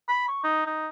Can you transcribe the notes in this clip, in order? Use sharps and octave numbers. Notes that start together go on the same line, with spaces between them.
B5
C#6
D#4
D#4